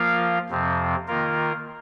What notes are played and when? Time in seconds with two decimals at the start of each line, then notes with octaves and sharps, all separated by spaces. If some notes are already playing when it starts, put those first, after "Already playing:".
Already playing: F3 A#3 F4 A#4 F5
0.49 F2 C3 F3 C4
1.07 D#3 A#3 F4 A#4